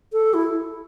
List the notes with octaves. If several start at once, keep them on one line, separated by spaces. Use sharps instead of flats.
A4
E4